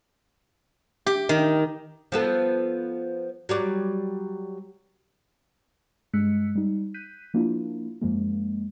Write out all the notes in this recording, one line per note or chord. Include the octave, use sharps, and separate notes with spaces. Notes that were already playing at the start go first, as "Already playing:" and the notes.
G4
D#3
F3 B3 A4
F#3 G3 D5
G2 G#3 E6 F#6 B6 C#7
G3 D#4
F#6 G6 B6 D#7
F3 A#3 D4 E4 F4
F#2 F3 G#3 A#3